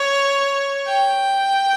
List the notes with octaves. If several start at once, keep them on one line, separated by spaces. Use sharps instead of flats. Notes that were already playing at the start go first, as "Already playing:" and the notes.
Already playing: C#5
G5